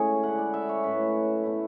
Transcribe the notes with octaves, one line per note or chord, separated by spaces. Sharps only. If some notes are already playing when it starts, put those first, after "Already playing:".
Already playing: A2 G#3 C#4 G#4 C#5
D3 G#3 C#4 E4 F#5
D5
E5
C#5
A2 F#3 C#4 B4
B2 A3 E4